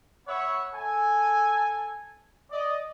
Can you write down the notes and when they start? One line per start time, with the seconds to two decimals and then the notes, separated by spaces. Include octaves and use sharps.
0.27 B3 C#5 E5 F#5 B5 C#6
0.74 A4 G#5
2.51 D5 D#5